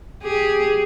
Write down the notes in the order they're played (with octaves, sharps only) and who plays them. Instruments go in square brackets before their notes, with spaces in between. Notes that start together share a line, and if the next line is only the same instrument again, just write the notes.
[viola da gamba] G4 G#4